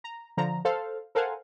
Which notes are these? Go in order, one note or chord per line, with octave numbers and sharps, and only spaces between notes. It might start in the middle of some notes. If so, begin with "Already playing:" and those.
A#5
D3 F3 A#5
A4 C5 F5
A4 A#4 C5 F5 F#5 G#5